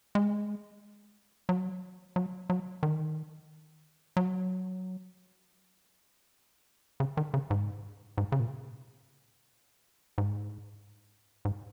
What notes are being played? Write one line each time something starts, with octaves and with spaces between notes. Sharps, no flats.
G#3
F#3
F#3
F#3
D#3
F#3
C#3
D#3
C#3
G#2
G#2
C#3
A#2
G#2
G#2